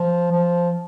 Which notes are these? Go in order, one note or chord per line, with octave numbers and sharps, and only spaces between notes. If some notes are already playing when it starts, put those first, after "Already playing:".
Already playing: F3
F3